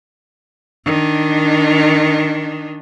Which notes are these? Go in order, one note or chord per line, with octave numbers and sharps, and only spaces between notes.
D#3 D4